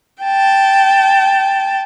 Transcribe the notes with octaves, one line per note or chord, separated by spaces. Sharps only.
G5 A5